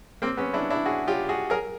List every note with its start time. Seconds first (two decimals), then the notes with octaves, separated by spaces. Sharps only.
0.22 A#3 C4
0.37 B3 C#4
0.53 D4 E4
0.70 D4 E4
0.86 F#4 G#4
1.08 F4 G4
1.29 F#4 G#4
1.50 G#4 A#4